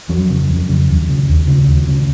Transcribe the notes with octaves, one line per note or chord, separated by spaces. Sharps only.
F2 F#3
C#3
F2
C#3
D#2
C#3
D#2
C#3
D#2
C#3